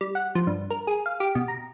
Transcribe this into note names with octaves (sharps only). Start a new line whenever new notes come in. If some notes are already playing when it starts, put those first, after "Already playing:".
G3
F#5
F3
G2
A#4
G#4
F5
G4
B2
A#5